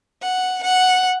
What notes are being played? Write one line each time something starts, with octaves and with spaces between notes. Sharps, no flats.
F#5
F#5